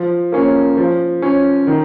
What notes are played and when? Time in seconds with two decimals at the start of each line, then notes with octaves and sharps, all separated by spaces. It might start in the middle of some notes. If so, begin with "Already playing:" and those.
Already playing: F3
0.32 A#3 C#4
0.77 F3
1.22 C#4
1.67 D#3